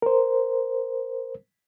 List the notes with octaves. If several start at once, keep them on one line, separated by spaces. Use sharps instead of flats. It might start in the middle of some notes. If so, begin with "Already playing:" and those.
A#4 C5